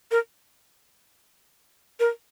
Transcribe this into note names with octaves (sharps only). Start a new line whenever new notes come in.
A#4
A#4